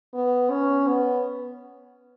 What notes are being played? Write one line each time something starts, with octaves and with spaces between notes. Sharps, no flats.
B3
C#4
B3